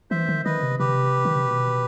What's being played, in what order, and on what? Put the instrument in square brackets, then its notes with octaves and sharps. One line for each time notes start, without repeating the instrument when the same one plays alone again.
[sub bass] E3 [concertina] C5 E5
[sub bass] D#3
[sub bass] D#3 [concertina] B4 D#5
[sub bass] C3
[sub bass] C3 [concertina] G4 B4
[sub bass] D#3
C3
B2